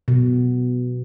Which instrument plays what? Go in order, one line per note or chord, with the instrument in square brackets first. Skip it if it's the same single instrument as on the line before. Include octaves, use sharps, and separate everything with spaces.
[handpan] B2